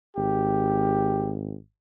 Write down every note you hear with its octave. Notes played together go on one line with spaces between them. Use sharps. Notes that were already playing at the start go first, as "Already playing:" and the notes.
G#1 G4